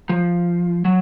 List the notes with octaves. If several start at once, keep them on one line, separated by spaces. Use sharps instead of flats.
F3
F#3